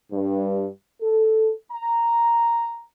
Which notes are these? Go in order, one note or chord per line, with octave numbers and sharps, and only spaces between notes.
G2
A4
A#5